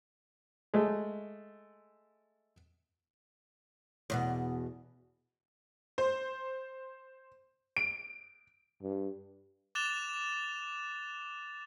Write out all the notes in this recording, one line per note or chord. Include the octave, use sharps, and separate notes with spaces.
G#3 A3
E2 B2 B3
C5
D7
G2
D6 F#6 A6 E7 F7 G7